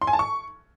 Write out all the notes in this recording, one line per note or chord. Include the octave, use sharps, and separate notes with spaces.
C6
G#5
A5
C#6